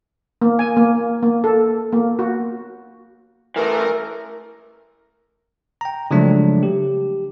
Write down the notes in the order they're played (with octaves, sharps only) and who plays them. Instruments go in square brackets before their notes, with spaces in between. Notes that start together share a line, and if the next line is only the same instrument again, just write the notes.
[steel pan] A#3
G#5
A#3
A#3
A4
A#3
F#4
[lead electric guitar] E3 A3 [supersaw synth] A#4
[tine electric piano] G5 A#5
C#3 F3 F#3 G#3 A3 D4
G4